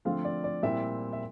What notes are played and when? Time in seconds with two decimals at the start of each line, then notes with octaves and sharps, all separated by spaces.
0.05 D3 F3 A3 C4 F4 F5
0.25 D5
0.44 D5
0.63 A#2 G3 C4 E4 E5
1.13 E5